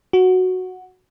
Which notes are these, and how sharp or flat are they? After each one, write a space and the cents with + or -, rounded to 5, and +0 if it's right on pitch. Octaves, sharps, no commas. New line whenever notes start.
F#4 -5